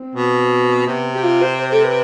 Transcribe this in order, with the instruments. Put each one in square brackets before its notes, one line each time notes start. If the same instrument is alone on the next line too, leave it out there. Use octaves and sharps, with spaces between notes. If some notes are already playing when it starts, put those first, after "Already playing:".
Already playing: [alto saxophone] C4
[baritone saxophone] B2
[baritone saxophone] C3 [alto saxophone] B3
[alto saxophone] G4
F4
C5
C5
A4
B4